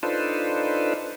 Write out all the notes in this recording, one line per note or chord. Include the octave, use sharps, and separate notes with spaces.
D4 D#4 F4 A4 B4 C5